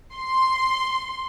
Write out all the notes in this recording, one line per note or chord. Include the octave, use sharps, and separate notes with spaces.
C6